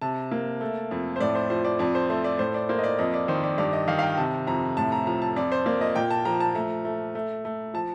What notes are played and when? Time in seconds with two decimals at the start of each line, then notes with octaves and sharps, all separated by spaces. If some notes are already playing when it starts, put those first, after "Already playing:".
0.01 C3 A5
0.31 A#3
0.61 A3
0.91 F2
1.16 C5
1.20 A2 D5
1.35 C5
1.50 F3 C5
1.65 D5
1.79 F2 D5
1.95 C5
2.09 A3 C5
2.24 D5
2.39 A2 C5
2.54 D5
2.69 A#3 C5
2.78 D#5
2.84 D5
2.99 F2 D#5
3.14 D5
3.28 D#3 C5
3.43 D5
3.58 G2 D5
3.73 D#5
3.88 D#3 F5
3.99 F5
4.03 G5
4.18 C3 A5
4.47 F2 A#5
4.77 A2 A5
4.92 A#5
5.07 F3 A#5
5.22 A5
5.36 F2 D5
5.52 C5
5.66 A#3 D5
5.81 D#5
5.95 A#2 G5
6.11 A5
6.25 F3 A#5
6.40 A5
6.55 A3 A#5
6.85 A3
7.15 A3
7.45 A3
7.74 F3 A5